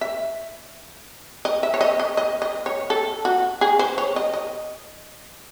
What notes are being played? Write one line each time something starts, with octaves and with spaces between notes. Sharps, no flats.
E5
D#5
E5
C#5
D#5
D#5
D#5
D#5
C#5
A4
F#4
G#4
C5
C#5
D#5
D#5